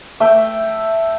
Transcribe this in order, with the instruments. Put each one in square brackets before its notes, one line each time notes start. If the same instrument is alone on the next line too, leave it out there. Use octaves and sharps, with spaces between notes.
[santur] A3 E5 G5